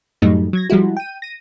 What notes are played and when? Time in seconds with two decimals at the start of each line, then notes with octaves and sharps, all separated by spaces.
0.22 F#2 A2 F#3 G3 A3 D#4
0.53 F#3 G#6 A#6
0.70 F3 G3 G#3 E4 F#4
0.97 G5 D#7
1.22 A#6 D#7